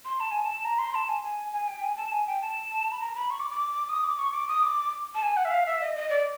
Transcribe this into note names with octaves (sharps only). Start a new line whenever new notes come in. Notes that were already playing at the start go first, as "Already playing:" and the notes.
C6
A5
G#5
A5
A#5
C6
A5
G#5
G#5
G#5
G5
G#5
A5
G#5
G5
A5
B5
A#5
B5
C#6
D6
D6
D#6
D6
C#6
D6
D#6
D6
A5
G#5
F#5
E5
F5
E5
D#5
D#5
D5